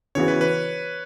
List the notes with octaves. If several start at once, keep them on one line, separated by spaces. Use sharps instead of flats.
C#3 E3 B3 F#4 C#5
B4
B4